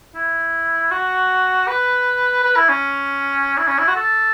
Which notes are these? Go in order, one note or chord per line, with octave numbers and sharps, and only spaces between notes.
E4
F#4
B4
B4
E4
C#4
E4
C#4
E4
F#4
A4